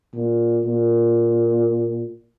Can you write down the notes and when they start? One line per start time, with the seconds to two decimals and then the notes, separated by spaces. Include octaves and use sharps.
0.15 A#2
0.65 A#2